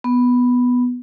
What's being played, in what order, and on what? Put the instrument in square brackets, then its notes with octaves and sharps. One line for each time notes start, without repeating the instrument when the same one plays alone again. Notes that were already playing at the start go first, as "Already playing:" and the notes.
[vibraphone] B3